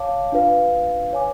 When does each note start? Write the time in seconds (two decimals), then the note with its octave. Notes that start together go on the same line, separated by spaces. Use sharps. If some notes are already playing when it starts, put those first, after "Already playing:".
Already playing: C#5 F5 A5 D6
0.32 D4 F4 B4 F5
1.13 C#5 G#5 D6